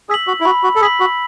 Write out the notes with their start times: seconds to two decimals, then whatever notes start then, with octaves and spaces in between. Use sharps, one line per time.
0.09 G#4 E6 B6 F#7
0.27 F#4
0.40 E4
0.45 F#4 B5
0.63 F#4
0.75 A4
0.81 G#4 E6 B6 F#7
1.00 F#4